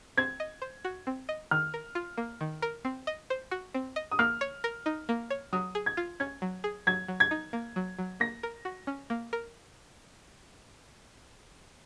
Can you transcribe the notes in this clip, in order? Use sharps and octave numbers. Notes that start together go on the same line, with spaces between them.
C4 G#6
D#5
C5
F#4
C4
D#5
D#3 F6
A#4
F4
A#3
D#3
A#4
C4
D#5
C5
F#4
C4
D#5
D#6
A#3 F6
C#5
A#4
D#4
A#3
C#5
F#3 D#6
G#4
G#6
F4
C#4 G#6
F#3
G#4
F#3 G#6
F#3
G#6
D#4
A#3
F#3
F#3
A#3 A#6
A#4
F#4
C#4
A#3
A#4